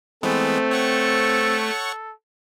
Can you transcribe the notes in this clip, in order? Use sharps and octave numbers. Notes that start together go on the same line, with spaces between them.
E3 G#3 A3 B3 C4
A4 C#5 F#5 C#6